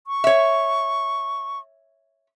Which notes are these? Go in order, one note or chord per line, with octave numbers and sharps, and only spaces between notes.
C#6
C#5 E5